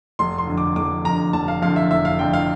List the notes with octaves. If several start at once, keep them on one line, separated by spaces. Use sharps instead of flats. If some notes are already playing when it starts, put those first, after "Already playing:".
F1 C6
C6
F2 D3
D6
F1 D6
F2 D3 A#5
F1 A5
F5
F2 D3 F5
E5
F1 E5
F5
F2 D3 G5
F5